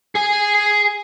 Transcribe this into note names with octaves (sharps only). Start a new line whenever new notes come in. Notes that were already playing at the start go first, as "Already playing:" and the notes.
G#4 G#5